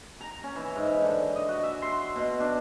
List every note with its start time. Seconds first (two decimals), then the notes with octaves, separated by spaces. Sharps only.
0.21 A#5
0.44 C#4
0.56 E3
0.76 G#2
1.02 D3
1.36 D#5
1.49 F#4
1.63 E5
1.82 C6
2.16 B2
2.40 D4